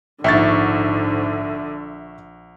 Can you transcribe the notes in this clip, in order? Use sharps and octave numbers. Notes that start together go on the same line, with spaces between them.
A#1 G#2 D3 E5 C#6 A6